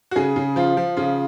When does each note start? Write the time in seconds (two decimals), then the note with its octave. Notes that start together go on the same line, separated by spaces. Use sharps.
0.11 F#4
0.16 C#3 G#4
0.36 C#3
0.56 F3 F4
0.77 F3
0.97 C#3 F4